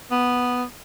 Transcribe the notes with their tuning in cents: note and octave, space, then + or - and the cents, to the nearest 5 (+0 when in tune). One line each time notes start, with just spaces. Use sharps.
B3 +0